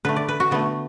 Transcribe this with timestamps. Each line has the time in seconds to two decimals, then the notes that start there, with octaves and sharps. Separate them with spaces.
0.05 D3 A3 B4
0.16 D5
0.29 B4
0.40 F#4
0.51 D3 A3 B3